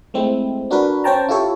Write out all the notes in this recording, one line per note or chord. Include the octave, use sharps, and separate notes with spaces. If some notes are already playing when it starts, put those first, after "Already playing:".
G#3 A3 C4 E4
D4 F#4 A#4 B4
C#4 C5 C#5 G5 A5 A#5
E4 F4 G4 A4 C#5